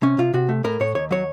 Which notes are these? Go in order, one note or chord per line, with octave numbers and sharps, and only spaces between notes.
C3 C#4
C3 F4
C3 F#4
A3
A2 A#4
A2 C#5
D#2 C#5
F#3 C#5